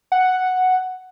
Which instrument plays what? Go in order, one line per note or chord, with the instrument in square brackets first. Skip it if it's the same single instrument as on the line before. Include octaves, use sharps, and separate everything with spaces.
[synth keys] F#5